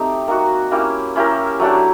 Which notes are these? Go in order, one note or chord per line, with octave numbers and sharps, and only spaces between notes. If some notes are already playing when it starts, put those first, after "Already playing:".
Already playing: A3 C4 D#4 G4
A#3 D#4 F#4
A#3 C#4 E4 G4
C#4 E4 G4 A#4
F#3 A3 D4 G4